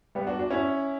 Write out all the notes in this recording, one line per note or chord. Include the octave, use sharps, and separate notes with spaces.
G3 B3
D4 F#4
D4 F#4
C#4 E4